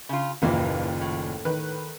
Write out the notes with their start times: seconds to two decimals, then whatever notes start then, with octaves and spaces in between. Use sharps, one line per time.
0.09 C#3 F4
0.42 F#1 D#2 A#2 D#3 E3 A#3
1.01 A2
1.45 D#3 B4